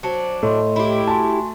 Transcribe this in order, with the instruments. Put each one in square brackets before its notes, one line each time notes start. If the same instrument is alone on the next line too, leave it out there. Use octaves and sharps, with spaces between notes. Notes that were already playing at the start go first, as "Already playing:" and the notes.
[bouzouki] F#3 D4 [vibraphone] C5
[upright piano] A2 [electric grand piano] A3 [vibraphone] D#5 C6
[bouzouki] E4 G4
[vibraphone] F#4 G#5 C6 [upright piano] A5